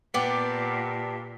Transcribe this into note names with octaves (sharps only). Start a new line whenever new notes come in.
A#2 B3 D4 G4